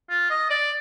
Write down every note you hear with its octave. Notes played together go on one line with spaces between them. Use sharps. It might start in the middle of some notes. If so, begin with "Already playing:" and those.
F4
D#5
D5